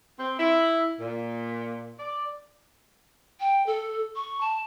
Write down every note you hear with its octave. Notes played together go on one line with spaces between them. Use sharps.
C4
E4
A#2
D5
G5
A4
C#6
A5